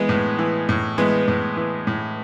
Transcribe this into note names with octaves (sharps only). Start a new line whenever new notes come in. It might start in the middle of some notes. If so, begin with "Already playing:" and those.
Already playing: E3 G#3 B3
A2
E3
A2
E3 G#3 B3
A2
E3
A2